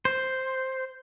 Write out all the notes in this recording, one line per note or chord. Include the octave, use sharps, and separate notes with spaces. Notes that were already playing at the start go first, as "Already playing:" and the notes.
C5